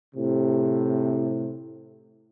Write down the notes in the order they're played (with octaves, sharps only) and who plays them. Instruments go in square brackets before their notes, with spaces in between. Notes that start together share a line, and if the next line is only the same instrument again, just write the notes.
[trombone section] A2 C3